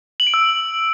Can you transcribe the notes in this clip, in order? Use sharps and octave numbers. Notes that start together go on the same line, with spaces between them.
F#7
D7
E6